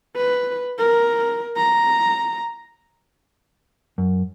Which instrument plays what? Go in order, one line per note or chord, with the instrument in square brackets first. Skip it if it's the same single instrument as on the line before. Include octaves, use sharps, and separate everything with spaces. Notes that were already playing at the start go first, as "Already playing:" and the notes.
[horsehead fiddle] B4
A#4
A#5
[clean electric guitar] F#2